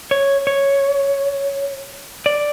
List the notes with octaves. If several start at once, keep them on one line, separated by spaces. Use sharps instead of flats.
C#5
C#5
D5